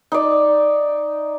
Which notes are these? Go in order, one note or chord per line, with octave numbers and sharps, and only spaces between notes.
D#4 D5